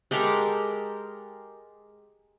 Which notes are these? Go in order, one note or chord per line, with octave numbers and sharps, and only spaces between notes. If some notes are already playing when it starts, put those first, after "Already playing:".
G#3 G4 A4 A#4